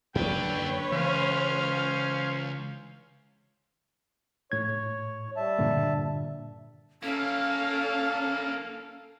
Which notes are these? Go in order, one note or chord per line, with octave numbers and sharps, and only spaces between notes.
F#2 D3 F#3 A#3 B4 C#5 D5 G5
C#2 E3 C#4 C5 F5
A2 C#5 G#6
G3 E5 A5
G2 A#2 D3
A#3 C#4 E4 A4 F5